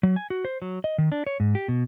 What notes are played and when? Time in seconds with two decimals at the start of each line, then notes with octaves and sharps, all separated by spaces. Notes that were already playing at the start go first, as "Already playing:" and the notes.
0.03 F#3
0.16 G#5
0.30 F#4
0.45 C5
0.62 F#3
0.84 D#5
0.98 D#3
1.12 D4
1.27 C#5
1.40 G#2
1.55 G4
1.68 B2